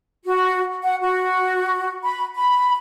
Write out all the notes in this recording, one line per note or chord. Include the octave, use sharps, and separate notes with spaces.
F#4
F#5
F#4
B5
B5